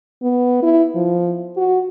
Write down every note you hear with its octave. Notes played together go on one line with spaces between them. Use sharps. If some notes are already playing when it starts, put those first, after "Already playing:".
B3
E4
F3
F#4